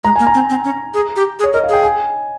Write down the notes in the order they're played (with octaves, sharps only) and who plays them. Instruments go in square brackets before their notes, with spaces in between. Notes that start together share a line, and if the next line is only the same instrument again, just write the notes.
[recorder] G#3 [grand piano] A#5
[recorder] A#3 [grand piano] G#5
[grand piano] A#5
[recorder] C4
C4
C#4
G#4
G4
G#4
[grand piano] C#5
[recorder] A#4 [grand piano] D#5
[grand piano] F5
[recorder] G#4 [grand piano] G5
[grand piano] G#5